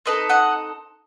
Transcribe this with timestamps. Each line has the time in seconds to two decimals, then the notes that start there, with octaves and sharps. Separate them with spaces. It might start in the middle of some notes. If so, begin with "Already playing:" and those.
0.06 C4 D#4 A4 B4 D#5
0.29 D#5 F#5